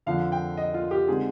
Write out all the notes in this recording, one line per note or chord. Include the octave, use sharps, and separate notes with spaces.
F2 D3 F3 F5
G5
D#5
F4
G4
D3 G#3 C4 D#4 G#4